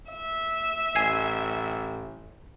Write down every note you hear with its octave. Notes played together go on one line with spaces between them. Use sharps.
E5
A1 G#5 G#6 C7